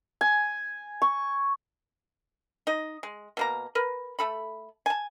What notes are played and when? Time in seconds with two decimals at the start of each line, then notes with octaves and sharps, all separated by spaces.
0.21 G#5
1.02 C#6
2.67 D#4 D#5
3.03 G#3
3.37 B2 A#3 A#5
3.75 A#4 B4
4.19 A3 A4 B5
4.86 G#5 A5